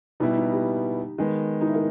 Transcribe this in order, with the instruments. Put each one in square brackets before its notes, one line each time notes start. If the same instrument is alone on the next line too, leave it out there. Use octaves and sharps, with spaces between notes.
[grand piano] B2 G3 B3 E4 [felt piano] D#4
[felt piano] D#4
G4
[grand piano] D#3 G#3 B3
[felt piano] D#4
E4
A#4